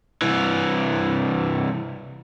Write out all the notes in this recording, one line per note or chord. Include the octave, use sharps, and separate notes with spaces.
C2 E3